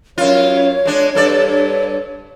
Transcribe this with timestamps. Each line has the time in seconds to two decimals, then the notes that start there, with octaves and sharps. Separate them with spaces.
0.18 F#2 F4 C#5
0.85 G#3 D4
1.15 G2 A4 D5